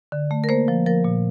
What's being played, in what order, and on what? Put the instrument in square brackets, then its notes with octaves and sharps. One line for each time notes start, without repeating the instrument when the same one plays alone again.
[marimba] D3
A3
A#4
A#3 C5
F3
F3 A#4
A#2